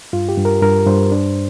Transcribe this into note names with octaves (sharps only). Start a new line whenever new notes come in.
G2 F4
G4
G2
A#4
G2 A#4
G2 C5
D4